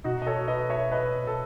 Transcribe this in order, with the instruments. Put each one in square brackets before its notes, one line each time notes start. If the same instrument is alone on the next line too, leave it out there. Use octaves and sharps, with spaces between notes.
[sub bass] B2 [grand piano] D#4 F#4
[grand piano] D#5
A4 C#5
B4 D#5
C#5 E5
B4 D#5
A4